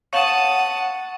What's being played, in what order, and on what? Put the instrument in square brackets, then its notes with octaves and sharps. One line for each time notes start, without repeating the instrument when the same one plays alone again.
[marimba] C#5 F5 [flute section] F#5 [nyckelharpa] A5 D#6 [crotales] C#6 F#7